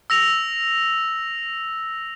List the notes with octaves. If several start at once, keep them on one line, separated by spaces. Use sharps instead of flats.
E6 A#6 F7